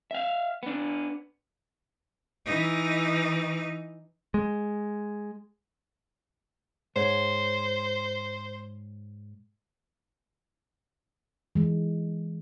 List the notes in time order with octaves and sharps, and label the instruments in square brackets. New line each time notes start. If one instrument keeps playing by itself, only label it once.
[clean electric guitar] E5 F5
B3 D4
[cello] E3 D#4
[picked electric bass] G#3
[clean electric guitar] G#2 C#5 [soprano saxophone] C5
[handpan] E3 G#3